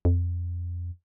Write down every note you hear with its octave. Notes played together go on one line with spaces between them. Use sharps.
F2